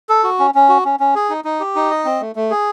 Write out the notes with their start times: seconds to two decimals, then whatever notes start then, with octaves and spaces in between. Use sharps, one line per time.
0.09 A4
0.24 F#4
0.39 C#4
0.55 C#4
0.69 F#4
0.85 C#4
1.00 C#4
1.15 G#4
1.30 D#4
1.44 D#4
1.60 G4
1.75 D#4
1.90 D#5
2.05 C4
2.20 A3
2.36 A3
2.51 G#4